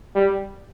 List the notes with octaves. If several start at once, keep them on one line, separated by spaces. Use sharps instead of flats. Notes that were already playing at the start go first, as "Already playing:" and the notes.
G3